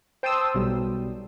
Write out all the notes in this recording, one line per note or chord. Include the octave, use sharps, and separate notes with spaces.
C5 G5 A5 C6 D#6 E6
B1 G3